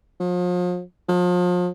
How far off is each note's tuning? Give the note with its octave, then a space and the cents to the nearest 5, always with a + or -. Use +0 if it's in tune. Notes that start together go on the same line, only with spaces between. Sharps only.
F3 +40
F3 +35